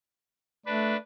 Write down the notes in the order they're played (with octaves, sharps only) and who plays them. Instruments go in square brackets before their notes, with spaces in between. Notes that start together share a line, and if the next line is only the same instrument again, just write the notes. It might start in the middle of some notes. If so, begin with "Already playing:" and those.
[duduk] A3 [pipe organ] D4 B4